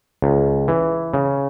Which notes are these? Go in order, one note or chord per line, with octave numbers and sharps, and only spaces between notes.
C#2
E3
C#3